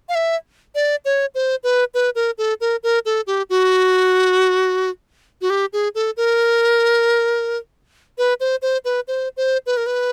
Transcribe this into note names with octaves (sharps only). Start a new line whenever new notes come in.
F5
E5
D5
C#5
C5
B4
B4
A#4
A4
A#4
A#4
A4
G4
F#4
F#4
G4
G#4
A4
A#4
B4
C5
C5
B4
C5
C5
B4
A#4
B4